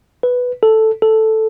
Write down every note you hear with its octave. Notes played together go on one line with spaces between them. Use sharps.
B4
A4
A4